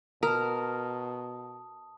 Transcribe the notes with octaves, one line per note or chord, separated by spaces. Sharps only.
B2 A#4 A5 D#6